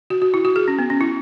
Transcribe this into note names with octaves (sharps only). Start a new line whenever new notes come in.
F#4
F#4
E4
F#4
G#4
C#4
B3
C#4
E4